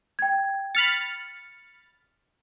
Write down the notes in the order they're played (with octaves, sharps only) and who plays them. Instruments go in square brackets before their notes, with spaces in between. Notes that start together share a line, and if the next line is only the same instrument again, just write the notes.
[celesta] G5 G#6
[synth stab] B5 F6 A6 [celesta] C#7